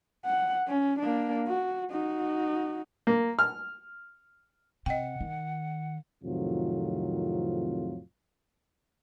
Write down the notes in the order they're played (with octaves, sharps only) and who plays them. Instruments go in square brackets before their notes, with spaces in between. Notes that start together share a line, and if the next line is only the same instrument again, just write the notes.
[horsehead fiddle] F#5
C#4
A#3 D4
F#4
D#4 F#4
[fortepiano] A#3
F6
[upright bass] C3 [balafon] D#5 G5 [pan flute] F#5
[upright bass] D#3
[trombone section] F2 A2 C3 D#3 F#3 F4